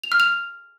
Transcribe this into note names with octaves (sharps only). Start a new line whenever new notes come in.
F7
F6
F7